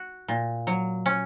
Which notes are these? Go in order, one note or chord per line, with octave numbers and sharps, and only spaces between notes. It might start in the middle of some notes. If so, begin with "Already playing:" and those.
Already playing: F#4
A#2
F#3
C#4